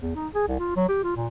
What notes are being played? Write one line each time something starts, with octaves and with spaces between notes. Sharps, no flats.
E2
D#4
G#4
C2
F4
F#3
G4
F4
A#2